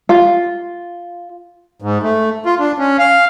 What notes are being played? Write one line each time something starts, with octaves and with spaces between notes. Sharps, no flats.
F4
G#2
A3
F4
D4
C#4
F5